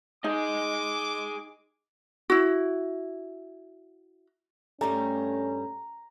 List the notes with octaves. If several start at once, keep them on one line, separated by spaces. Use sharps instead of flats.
D#4 G#4 D#5 D6
E4 F#4
G2 G3 A3 C#4 A#5